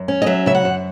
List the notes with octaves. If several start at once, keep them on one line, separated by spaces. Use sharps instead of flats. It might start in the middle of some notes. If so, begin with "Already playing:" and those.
Already playing: F#2
C#4
D#5
F#3 E5
C#3 E5
F#5
F#2